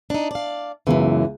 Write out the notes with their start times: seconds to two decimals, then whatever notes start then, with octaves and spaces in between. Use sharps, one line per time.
0.10 D4 D#4
0.31 D5 F5
0.87 C#2 F#2 E3 B3